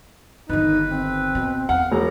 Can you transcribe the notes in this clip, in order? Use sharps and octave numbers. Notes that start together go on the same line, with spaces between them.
G1 D#3 D#4 B4
C4
B2
E2 F5 F#5
E1 A#5